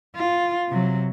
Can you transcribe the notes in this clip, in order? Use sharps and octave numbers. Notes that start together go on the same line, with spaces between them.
F4
C3 F#3